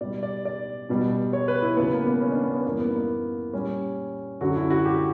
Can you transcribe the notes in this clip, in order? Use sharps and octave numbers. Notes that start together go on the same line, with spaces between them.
B2 G3 D5
D5
D5
E2 B2 G3
C#5
B4
E4
E2 C#3 F#3 B3
A#3
B3
C#4
D4
B3
B3
F#2 E3 G3 A#3
B3
A#3
A#2 G3 C#4
F#2 D3 F#3 F#4
E4
F#4
G4